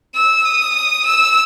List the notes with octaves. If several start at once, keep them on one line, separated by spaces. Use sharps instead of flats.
E6
D#6
E6